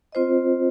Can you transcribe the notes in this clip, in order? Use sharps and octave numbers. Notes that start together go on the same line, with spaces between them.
C4 F4 C5 D#5